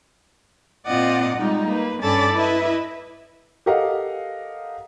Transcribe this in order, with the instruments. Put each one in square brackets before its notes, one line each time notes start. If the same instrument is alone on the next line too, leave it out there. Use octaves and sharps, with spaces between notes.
[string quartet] A#2 C4 F4 D5 D#5 F#5
G3 G#3 D#4 F4
A#3 B4
G2 C#4 A4 D5 B5 A6
E4 B4 D#5 E5
[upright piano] G4 A4 A#4 D#5 F5 F#5